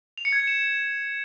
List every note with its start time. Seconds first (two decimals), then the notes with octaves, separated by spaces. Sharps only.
0.18 F7
0.25 C#7
0.33 G#6
0.40 C#7
0.48 E7